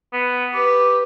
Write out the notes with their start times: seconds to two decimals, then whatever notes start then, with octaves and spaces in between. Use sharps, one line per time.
0.13 B3
0.54 G4 B4